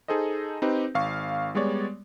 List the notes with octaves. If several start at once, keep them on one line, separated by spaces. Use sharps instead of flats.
D#4 G#4 A4 C5 D#5
C4 D#4 G4 B4
G#1 F5 C#6
G3 G#3 B3 C#5 D5